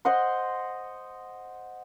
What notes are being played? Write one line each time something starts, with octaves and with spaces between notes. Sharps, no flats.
C5 D#5 F#5 C6